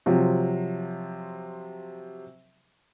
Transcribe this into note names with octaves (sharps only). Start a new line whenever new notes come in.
C3 F3 F#3